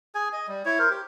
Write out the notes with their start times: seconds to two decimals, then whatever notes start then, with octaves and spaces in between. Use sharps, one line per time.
0.15 G#4 G#5
0.33 D#5
0.48 G3
0.65 E4 C#5
0.79 A#4 C5
0.90 G4